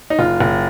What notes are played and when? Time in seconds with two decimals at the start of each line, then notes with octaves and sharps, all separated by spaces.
0.10 D#4
0.19 F#1 F4
0.40 F#1